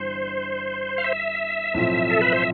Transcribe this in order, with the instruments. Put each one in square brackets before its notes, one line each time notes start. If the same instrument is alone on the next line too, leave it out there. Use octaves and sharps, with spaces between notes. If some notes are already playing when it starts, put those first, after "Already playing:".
Already playing: [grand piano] G1 G2 E3 G3 D4 [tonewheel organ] C5
[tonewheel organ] F5
E5
[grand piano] B1 A2 F3 C4 F4
[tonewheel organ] A4
B4
C5